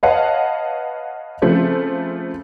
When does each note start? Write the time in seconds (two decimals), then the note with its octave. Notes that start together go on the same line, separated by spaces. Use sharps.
0.03 B4 C#5 D#5 F5 F#5 A5
1.42 C#3 F3 A3 C4 C5